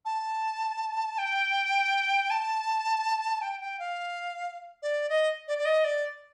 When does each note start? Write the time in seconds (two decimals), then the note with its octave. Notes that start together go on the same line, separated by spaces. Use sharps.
0.05 A5
1.18 G5
2.30 A5
3.42 G5
3.61 G5
3.79 F5
4.82 D5
5.09 D#5
5.48 D5
5.58 D5
5.65 D#5
5.84 D5